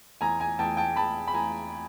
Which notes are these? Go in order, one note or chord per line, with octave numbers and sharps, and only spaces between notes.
E2 G#5 A#5
G#5 A#5
E2 G5 A5
G5 A5
E2 A5 B5
B5
E2 G#5 A#5